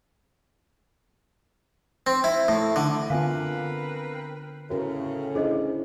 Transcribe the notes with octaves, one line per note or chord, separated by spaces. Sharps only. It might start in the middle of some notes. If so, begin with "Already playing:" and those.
C4
E4
A2
D3
D3 B3 C4 F4 A#4 B4 F5 G#5
A2 C#3 C#4 F#4 A#4 B4
C#4 D4 E4 G#4 C5 D#5